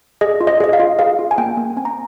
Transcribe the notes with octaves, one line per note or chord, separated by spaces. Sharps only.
G#4 D#5
F4
D#5
G#4 D#5
F5
F4
G#4 F5
F4
G#5
A#3 G5
A#3
C4 G#5
A#5